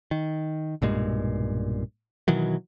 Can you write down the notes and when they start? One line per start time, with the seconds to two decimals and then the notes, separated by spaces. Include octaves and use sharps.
0.11 D#3
0.82 B1 G2 A#2 G#3
2.28 B2 D#3 E3 F#3